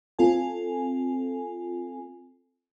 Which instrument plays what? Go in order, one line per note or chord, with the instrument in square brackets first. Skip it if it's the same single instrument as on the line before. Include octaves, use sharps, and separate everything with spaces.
[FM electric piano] C4 F4 A4 G#5